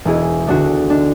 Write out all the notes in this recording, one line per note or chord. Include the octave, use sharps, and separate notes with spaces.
E1 E4 G#4
D2 D3 D4 F#4
D4